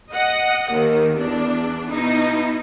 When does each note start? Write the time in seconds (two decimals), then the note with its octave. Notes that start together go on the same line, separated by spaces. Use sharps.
0.10 D#5 F#5
0.71 D#2 D#3
1.17 E2 D4
1.89 B2 D#4 E4